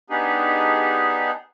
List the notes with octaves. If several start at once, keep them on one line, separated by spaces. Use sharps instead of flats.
B3 D4 D#4 G4 G#4